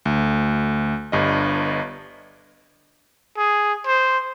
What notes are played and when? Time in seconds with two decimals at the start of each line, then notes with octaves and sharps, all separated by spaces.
0.05 D2
1.12 G1 G2 D#5
3.37 G#4
3.86 C5